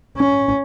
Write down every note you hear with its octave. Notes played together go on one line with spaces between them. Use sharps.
C#4